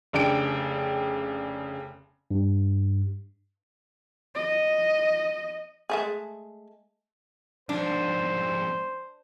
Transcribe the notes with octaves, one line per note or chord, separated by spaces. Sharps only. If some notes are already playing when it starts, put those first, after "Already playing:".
F1 C#3 D4 G5 D7
G2
D#5
G#3 A3 G#4
F2 G#2 D4 C5